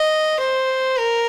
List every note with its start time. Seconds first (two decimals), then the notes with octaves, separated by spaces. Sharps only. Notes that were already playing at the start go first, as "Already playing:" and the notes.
Already playing: D#5
0.39 C5
0.98 A#4